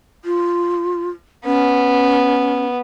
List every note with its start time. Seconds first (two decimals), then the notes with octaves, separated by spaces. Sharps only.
0.25 F4
1.45 B3 C#4